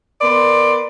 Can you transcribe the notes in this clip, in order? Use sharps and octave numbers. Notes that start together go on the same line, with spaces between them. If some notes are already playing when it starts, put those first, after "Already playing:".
B3 A#4 D5 C6